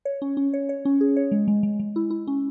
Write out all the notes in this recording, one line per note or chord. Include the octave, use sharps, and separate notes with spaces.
C#5
C#4
C#4
C#5
C#5
C#4
G#4
C#5
G#3
G#3
G#3
G#3
E4
E4
C#4